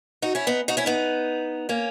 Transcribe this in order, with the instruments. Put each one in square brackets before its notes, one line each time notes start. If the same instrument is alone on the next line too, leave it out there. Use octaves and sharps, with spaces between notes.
[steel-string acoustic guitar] D#4 F#4
C#4 E4
B3 D#4
D#4 F#4
C#4 E4
B3 D#4
A#3 C#4